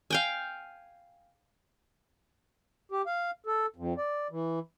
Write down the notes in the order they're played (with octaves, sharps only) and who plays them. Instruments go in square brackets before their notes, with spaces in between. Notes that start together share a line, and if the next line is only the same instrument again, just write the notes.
[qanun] F5 G5 G#5
[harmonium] G4
F5
A4
F2
D5
E3